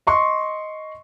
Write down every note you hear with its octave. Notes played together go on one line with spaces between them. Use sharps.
D#5 C6 C#6